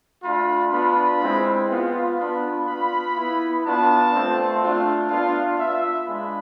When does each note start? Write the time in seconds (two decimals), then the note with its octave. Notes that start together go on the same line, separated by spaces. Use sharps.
0.23 A3 D4 F4 B5
0.72 B3 D4 F4 B5
1.21 G#3 C4 E4
1.69 B3 F4
2.18 B3 D4 F4 B5
2.67 B3 F4 B5
3.15 B3 E4
3.64 B3 D4 F4 A5
4.12 A3 C4 F4
4.62 A3 D4 F4
5.09 B3 D4 F4 F5
5.58 B3 F4 E5
6.07 G#3 D4 F4 B5